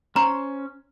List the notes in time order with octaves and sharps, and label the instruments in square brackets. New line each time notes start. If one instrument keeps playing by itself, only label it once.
[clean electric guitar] C#4 C5 [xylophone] A#5